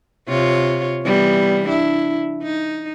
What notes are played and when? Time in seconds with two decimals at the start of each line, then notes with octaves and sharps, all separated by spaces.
0.28 C3 F4 C#5
1.03 E3 G3 B3
1.65 D4 E4
2.43 D#4